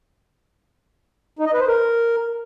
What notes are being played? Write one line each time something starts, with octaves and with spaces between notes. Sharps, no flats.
D#4
D#5
B4
C5
A#4